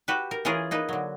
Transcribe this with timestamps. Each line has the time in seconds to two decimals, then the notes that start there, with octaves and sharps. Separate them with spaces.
0.08 F#4 G4 B4
0.31 A#4
0.45 E3 C#4 F4 G#4 A#4
0.71 A#3 D#4 B4
0.89 D3 F#3